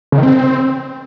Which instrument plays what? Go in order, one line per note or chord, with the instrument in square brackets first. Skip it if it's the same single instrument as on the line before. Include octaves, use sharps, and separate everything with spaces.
[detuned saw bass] C#3
D#3
C4